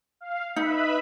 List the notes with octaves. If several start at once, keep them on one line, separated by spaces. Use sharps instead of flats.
F5
D#4 B4 E5 B5